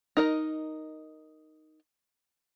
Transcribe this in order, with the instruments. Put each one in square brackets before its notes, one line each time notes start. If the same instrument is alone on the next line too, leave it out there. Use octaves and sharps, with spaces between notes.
[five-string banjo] D#4 A#4 D#5